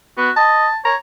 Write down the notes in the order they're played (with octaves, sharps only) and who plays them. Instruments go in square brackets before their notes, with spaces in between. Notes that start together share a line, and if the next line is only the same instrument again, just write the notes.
[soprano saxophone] B3 [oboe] F#4
[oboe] D#5 [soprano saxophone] A5
[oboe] C#5 [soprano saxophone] A#5